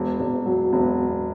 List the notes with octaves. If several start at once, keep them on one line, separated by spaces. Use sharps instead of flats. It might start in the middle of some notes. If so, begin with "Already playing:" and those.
Already playing: E1
E1
F#3
E1